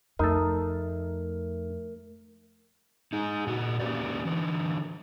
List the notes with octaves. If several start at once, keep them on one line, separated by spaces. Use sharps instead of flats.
F2 A3 D#4 A4 A#4
D#4 G#4
A#2 F#4
A#3 C#4 G4 B4 C5 D5
D3 E3